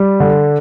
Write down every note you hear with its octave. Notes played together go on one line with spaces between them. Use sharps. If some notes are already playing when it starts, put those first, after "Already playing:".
Already playing: G3
D3